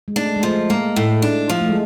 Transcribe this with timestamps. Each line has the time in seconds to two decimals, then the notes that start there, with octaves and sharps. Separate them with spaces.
0.08 G#3
0.16 A3 D4
0.36 G#3
0.43 F3 A3
0.69 G#3 A#3
0.96 A2
1.22 D4
1.49 F3
1.61 A3
1.69 G#3